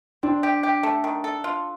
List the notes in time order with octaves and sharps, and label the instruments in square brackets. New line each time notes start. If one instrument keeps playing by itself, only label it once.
[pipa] C4 [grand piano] D4
[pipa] G4
G4
A3
D#3
A4
F4